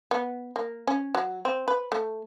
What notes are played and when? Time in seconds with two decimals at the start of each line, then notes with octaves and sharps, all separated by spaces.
0.11 B3
0.56 A#3
0.87 C#4
1.15 F#3
1.45 C4
1.68 B4
1.92 A3